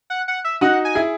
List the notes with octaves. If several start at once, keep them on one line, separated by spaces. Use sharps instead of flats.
F#5
F#5
E5
D#4 F#4 F#5
G#5
E4 G#4